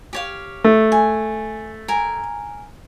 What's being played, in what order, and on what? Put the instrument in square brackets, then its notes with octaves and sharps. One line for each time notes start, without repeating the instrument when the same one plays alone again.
[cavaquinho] G4 C#5 F5
[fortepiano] A3
[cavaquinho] G#5
A#4 G#5